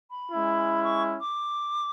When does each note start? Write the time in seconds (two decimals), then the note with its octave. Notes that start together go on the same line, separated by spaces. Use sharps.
0.11 B5
0.30 G#3 C#4 E4
0.84 C#6
1.20 D6